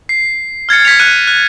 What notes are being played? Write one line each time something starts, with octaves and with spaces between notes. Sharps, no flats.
C7
F6 G#6 A6 C#7
G#6 B6 C#7 F7
F#6 C#7 D#7
F#6